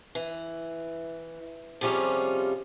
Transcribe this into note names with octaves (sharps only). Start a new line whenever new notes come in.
E3
C3 F3 G3 C#4 F4 G#4